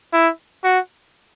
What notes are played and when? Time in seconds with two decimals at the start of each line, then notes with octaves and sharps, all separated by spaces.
0.13 E4
0.64 F#4